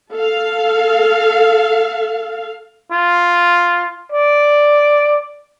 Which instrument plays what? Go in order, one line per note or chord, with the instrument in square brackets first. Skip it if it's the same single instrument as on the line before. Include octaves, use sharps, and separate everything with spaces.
[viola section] A4 F5
[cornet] F4
D5